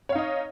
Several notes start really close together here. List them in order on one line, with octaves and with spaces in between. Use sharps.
C#5 F5 D#4 D#5